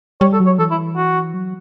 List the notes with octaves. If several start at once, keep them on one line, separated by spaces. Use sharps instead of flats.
G3 C#5
A4
F#3
C#5
E3 A4
E4
F#4
F#3